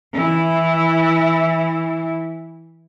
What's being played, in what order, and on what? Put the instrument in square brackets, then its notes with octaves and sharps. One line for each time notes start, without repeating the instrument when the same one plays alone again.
[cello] E3 E4